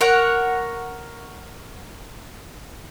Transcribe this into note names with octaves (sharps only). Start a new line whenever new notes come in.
A#4 C#5 F#5